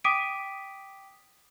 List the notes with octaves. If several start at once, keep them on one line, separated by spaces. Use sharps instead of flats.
G5 D6 D#6 B6 D7 D#7